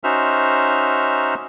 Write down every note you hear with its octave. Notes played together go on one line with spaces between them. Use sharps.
C#4 D#4 F#4 C5 E5 F6